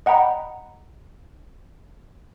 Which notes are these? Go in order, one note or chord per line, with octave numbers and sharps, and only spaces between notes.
D#5 F#5 G5 A#5 B5